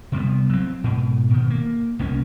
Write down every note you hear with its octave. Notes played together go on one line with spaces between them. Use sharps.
C3 G3 B3
F#3 C4
G#2 B2
B2 D#3
A#3
C2 A#3 C#4